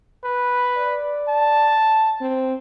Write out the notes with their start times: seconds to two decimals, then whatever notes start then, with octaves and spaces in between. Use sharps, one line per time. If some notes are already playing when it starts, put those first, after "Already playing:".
0.24 B4
0.77 D5
1.28 A5
2.21 C4